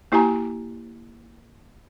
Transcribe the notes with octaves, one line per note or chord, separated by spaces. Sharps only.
A#3 E4 G4 G#5 A#5